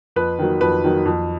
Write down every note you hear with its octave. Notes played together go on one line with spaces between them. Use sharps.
F2 B4
D#3 F#3
F2 B4
D#3 F#3
F2